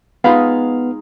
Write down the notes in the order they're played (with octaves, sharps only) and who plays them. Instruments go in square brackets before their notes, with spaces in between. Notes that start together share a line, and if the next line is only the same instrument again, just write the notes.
[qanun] G#3 D#4 F4 [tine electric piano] B3 [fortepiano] F5 B5